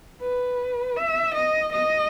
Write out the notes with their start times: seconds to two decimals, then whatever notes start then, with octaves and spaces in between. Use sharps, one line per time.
0.21 B4
0.96 E5
1.35 D#5
1.73 D#5